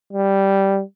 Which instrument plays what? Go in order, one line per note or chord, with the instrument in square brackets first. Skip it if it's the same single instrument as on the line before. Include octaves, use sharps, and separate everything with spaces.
[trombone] G3